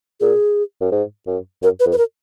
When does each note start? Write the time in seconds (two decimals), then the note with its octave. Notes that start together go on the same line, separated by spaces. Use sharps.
0.20 A#2 G#4
0.81 F#2
0.92 G#2
1.27 F#2
1.62 F#2 A#4
1.80 B4
1.86 F2
1.92 B4
1.98 A#4